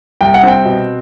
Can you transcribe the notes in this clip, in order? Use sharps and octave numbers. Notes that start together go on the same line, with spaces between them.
C2 G5
F#5
C4 G5
B2